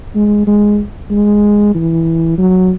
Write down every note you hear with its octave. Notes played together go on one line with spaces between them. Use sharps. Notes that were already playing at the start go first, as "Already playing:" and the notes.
G#3
G#3
G#3
E3
F#3